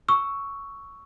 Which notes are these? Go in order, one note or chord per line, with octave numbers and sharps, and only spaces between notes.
C#6 E6